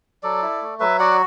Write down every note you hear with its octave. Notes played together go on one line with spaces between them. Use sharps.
F#3 A4 D5
E4
A3
F#3 B4 E5
F#4 D5 F#5